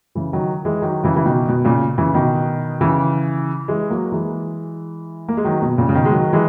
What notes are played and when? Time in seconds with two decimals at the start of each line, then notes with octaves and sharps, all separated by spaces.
0.15 C#3 E3
0.33 D#3 F#3
0.65 E3 G#3
0.82 D#3 F#3
1.04 C#3 E3
1.16 E3
1.26 B2 D#3
1.49 B2
1.65 A#2 C#3
1.98 C#3 E3
2.14 B2 D#3
2.81 C#3 E3
3.68 E3 G#3
3.90 F#3 A#3
4.12 E3 G#3
5.28 A#3
5.37 G#3
5.44 D#3 F#3
5.62 B2
5.78 A#2 C#3
5.89 C#3
5.94 B2 D#3
6.05 G#3
6.11 D#3 F#3
6.33 E3 G#3